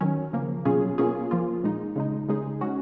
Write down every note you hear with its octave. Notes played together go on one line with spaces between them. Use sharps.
D#3 F#3 C#4
C#3 F3 A#3
B2 F#3 C#4 F4 G#4
B2 A#3 C#4 F4 G#4
F3 A#3 F4
A#2 G#3 D#4
C#3 G#3 D#4
C#3 G#3 D#4 G#4
G#3 C#4 F#4